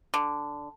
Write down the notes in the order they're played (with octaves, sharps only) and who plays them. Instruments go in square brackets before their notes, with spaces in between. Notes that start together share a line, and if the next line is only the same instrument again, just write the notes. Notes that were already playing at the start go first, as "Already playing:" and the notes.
[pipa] D3